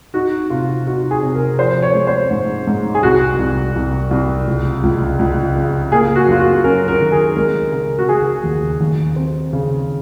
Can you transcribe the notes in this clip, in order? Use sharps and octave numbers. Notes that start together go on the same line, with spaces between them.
D#4 F#4
C3 F4
D#4 F#4
G#4
C3
A#4
F3 C5
C#5
G#3
C5
G#2
G#2
G#4
C2 F#4
C2
C2
C2
C#2
C#2
C#2
C#3
A#3 G#4
F#4
F#2 F4
F#4
C#4 A#4
A#4
D#3
G#4
G#3 A#4
C#3 A#4
F#4
C#3 G#4
D#2
D#2
C4
C#3